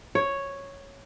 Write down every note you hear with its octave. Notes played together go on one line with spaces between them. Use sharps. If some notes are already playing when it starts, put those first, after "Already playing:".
C#5